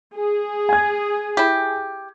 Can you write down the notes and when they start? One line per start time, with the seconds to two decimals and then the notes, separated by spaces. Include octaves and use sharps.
0.14 G#4
0.69 G#5 G#6
1.37 E4 G4